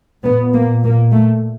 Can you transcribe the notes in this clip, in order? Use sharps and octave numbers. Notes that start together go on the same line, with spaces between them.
A#2 B3
A#3
A#3
A3